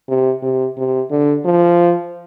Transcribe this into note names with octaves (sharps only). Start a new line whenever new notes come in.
C3
C3
C3
D3
F3